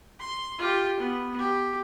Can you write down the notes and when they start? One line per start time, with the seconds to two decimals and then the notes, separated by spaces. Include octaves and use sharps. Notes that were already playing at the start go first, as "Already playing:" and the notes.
0.19 C6
0.58 F4 G4
0.99 B3
1.38 G4